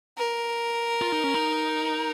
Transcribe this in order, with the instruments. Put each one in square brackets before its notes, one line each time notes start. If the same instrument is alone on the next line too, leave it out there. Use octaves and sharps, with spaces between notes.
[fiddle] A#4
[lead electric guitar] F4
D#4
C#4
D#4